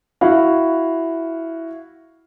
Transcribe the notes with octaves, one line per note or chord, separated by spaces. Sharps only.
E4 F#4 F5